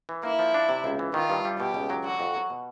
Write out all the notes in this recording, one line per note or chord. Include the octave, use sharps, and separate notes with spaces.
E3
A#3 E4
F3
D4
C3
C#2
E3
D#3 F4
G2
G3
B2 G4
C#2
F#3
D3 F#4
F2
F#3
B2